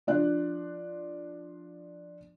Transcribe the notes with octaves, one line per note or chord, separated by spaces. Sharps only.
F3 D4 D5 F#6